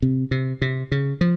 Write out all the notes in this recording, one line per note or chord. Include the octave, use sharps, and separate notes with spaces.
C3
C3
C3
C#3
F3